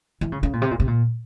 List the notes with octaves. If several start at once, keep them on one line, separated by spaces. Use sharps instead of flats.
E3
C#3
C#3
A#2
C3
A#2
C3
A#2